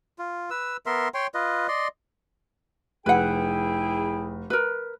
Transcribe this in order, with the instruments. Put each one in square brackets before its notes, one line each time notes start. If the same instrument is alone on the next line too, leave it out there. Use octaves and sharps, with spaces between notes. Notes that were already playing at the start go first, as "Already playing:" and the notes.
[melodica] F4
B4 E6
B3 A#4 E5 C6
C#5 G5 C6
F4 B4 D#5
D5 D#5 C6
[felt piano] F1 [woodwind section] E4 G#4 G5 [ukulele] B4 F#5
[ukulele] A#4 B4